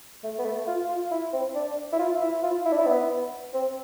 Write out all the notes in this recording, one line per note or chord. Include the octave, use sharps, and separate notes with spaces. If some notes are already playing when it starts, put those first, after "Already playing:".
A3
B3
A3
F4
F4
E4
C4
D4
E4
F4
E4
F4
E4
D4
E4
B3
C4